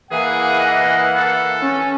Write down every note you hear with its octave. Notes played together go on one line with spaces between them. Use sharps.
E3 A#3 G#4 F#5
D#5
A4
C#4